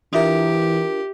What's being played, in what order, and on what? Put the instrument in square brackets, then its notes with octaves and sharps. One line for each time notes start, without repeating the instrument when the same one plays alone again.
[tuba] E3 [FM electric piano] D4 F4 A#4 [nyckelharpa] G4 [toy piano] E5 D#6